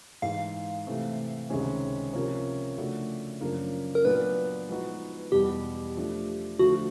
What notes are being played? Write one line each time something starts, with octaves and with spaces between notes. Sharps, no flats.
G#2 E3 G#3 F5
C3 E3 A3
C#2 C3 D#3 G#3 C#4
C3 F3 A#3 C#4
C#3 F3 A3 D4 F#4
F#2 C#3 F3 A#3 D4
A#4
A#2 F#3 B3 D4 B4
F3 G#3 B3 D#4 F#4
E2 B2 G3 G4
F3 A3 D4
D3 F3 A3 F#4